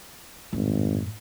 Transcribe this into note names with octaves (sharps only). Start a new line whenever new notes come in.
G#1 F#2 A2